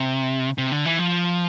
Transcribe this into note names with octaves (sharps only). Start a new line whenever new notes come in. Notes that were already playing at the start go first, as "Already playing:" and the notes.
Already playing: C3
C3
D3
E3
F3